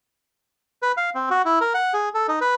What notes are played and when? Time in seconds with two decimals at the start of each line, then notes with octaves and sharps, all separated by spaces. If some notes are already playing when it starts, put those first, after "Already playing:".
0.82 B4
0.97 F5
1.15 C4
1.30 F#4
1.45 E4
1.61 A#4
1.74 F#5
1.94 G#4
2.14 A4
2.28 D#4
2.41 B4